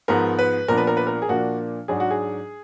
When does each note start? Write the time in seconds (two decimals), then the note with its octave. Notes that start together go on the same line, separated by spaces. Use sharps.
0.08 G#2 F3 B3 A#4
0.39 B4
0.68 A#2 F3 B3 D4 A#4
0.78 B4
0.87 A#4
0.97 B4
1.07 A#4
1.22 G#4
1.29 A#2 F3 A#3 D4 F#4
1.88 G#2 F#3 D4 G#4
2.00 F#4
2.11 G#4